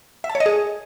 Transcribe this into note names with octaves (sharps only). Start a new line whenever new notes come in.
E5
A5
C#5
D#5
G#4